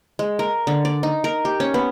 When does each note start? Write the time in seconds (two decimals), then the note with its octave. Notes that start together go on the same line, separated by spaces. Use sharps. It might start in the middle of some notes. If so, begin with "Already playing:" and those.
0.19 G#3
0.39 A#4
0.67 D3
0.85 D5
1.03 D#4
1.24 A#4
1.45 G4
1.60 C#4
1.74 B3